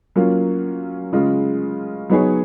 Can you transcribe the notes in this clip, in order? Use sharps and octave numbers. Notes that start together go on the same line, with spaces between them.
F#3 A#3 C#4 F4
C#3 G#3 C#4 F4
F#3 B3 D#4 G#4 C#5